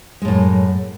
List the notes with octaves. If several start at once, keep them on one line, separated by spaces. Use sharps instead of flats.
F#2 A2 G#3